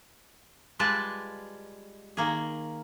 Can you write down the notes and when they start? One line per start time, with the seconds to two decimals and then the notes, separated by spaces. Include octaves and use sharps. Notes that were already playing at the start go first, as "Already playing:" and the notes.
0.79 G3 G#3 F4 B4 D5 A5
2.17 D#3 A#3 G#4